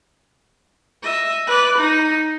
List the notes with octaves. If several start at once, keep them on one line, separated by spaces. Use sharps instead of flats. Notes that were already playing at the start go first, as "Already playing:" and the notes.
D#5 E5
B4 D5
D#4